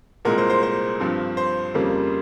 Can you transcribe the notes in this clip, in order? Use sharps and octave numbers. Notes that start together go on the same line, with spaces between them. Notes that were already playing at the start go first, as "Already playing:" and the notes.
C2 A#2 G#3 A#4
C5
C5
C5
G2 F3 C4
C5
F2 C#3 G3 A#3